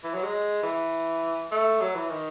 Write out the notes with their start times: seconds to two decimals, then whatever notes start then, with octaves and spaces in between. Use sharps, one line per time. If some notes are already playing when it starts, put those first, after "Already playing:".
0.04 E3
0.14 F#3
0.23 G#3
0.63 E3
1.51 A3
1.81 F#3
1.95 E3
2.10 D#3